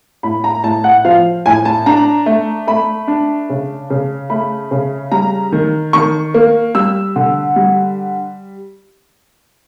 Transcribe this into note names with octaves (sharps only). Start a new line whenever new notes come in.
A2 B5
A#5
A2 A5
F#5
F3 F5
A2 G#5
A5
D4 A#5
A3
A3 B5
D4
C#3
C#3
A3 B5
C#3
G3 A#5
D#3
D#3 C#6
A#3
G3 E6
D3
G3